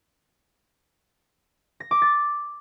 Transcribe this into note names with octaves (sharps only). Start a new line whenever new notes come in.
A#6
D6
A6